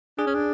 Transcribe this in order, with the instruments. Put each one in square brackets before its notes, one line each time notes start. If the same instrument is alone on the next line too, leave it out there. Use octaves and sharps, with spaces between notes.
[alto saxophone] D4 [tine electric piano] G#4
[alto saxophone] C#4
D4